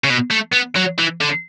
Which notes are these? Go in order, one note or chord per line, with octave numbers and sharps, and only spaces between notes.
C#3
B2
A3
B3
F#3
E3
D3